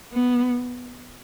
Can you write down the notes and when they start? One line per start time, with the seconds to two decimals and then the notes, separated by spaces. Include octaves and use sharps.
0.12 B3